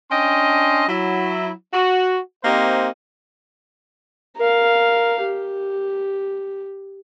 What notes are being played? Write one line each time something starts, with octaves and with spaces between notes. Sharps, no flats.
C#4 D4 D#5 G5 C6
F#3 E4
F#4
A#3 C4 D#4 G4 C5
A#4 F5
G4